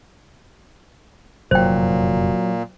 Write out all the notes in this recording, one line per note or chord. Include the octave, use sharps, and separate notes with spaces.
F1 F#2 A#2 D#3 F#3 C5 G5